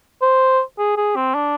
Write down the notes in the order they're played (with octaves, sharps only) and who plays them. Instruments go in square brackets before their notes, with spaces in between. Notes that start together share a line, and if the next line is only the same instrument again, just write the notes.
[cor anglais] C5
G#4
G#4
C4
D4